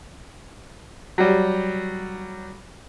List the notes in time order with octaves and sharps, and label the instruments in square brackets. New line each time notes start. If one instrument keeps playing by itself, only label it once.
[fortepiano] F#3 G3